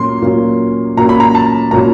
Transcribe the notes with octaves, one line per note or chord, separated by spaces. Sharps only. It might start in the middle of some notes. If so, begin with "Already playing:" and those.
Already playing: A#2 F#3 A#3 C#4 C6
A#2 F#3 A#3 C#4
A#2 F#3 A#3 C#4 A#5
B5
A#5
A5
A#2 F#3 A#3 C#4 A#5